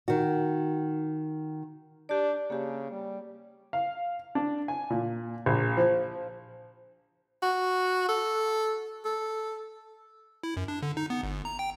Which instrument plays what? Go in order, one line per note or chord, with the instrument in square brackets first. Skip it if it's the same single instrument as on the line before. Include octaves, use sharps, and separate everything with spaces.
[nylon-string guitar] D#3 F#4
[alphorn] D4 [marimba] G4 D5
[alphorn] C#3 [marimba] A#3 G4
[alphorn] G3
[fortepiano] F5
D4
G#5
A#2
A#1
F3
[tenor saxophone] F#4
A4
A4
[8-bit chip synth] E4
F#2
D4
D3
D#4
B3
G1
A#5
G5